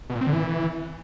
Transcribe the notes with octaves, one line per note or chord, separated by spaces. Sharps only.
B2
A#2
C4
D3
E3